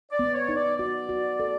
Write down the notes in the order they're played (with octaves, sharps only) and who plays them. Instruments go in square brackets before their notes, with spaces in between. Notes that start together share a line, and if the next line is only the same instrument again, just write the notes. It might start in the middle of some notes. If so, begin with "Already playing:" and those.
[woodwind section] D5
[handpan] B3
[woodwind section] C#5
[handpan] D#4
[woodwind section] D5
[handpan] F#4 [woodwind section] D5
[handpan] F#4
A4